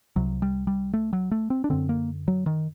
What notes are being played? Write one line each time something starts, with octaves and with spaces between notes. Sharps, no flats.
C2 C3 F#3
G3
G3
A3
F#3
A3
C4
D4
F#2 D3 C4
A#3
F#3
D#3